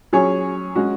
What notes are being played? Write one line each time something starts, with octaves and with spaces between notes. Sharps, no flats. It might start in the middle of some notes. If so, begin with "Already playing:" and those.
F#3 C#4 G#4 C#5
G#3 C#4 F#4